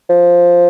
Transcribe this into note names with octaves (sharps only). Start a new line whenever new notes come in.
F3